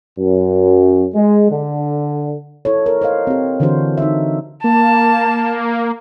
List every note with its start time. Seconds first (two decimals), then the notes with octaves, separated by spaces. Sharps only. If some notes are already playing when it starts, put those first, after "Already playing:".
0.18 F#2
1.14 G#3
1.50 D3
2.65 E4 A4 C#5
2.86 A#4
3.01 C5 C#5 D#5 F5
3.27 C4 G4
3.60 D3 E3 D4 F#4 C5
3.98 D#4 E5
4.64 A#3 A5